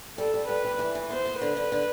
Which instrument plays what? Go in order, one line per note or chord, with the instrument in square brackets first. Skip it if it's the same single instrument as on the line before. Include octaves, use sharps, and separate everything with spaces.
[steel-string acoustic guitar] G3 [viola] A4
[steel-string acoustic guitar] G3
[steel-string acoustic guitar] G3 [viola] B4
[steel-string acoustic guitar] G3
E3
E3
[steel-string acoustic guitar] B3 [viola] C5
[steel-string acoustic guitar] B3
[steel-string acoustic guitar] D3 [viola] B4
[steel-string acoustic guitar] D3
D3